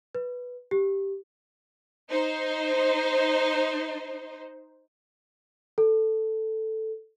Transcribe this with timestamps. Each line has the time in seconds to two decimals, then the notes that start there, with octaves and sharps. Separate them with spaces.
0.15 B4
0.71 G4
2.09 D#4 C5
5.78 A4